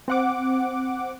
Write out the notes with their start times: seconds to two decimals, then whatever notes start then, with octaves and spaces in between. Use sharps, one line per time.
0.08 C4 F#5 D6